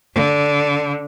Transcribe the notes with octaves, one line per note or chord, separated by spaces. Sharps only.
D3